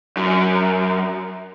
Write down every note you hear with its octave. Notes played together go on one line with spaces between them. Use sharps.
F#2